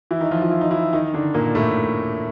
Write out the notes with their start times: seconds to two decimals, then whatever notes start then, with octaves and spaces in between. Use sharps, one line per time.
0.11 E3 E4
0.21 D#3 D#4
0.31 F3 F4
0.42 F4
0.51 E4
0.61 D#4
0.70 E3 E4
0.93 D#3 D#4
1.14 D3 D4
1.34 A#2 A#3
1.55 A2 A3